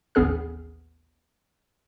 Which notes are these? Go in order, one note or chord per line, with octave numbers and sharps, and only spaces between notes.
A1 D#2 B3 G#4 F6